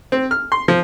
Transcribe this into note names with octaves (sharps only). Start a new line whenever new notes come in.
C4
F6
C6
F3